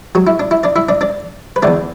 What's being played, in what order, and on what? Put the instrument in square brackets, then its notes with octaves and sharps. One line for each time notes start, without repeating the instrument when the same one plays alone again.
[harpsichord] F#3 F#4
E4
D4
E4
D4 D5
E4 E5
D4 D5
D4 D5
B4
E2 D3 A3 D4 D5